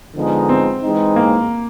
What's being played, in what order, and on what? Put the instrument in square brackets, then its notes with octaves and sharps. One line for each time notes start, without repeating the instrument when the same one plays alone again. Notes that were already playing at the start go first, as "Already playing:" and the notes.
[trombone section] D3 F3 G#3 B3 D#4
[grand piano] C4
[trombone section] E3 G#3 C4 D#4
[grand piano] A#3